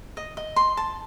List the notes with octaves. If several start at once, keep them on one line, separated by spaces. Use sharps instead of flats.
D#5
D#5
C6
A5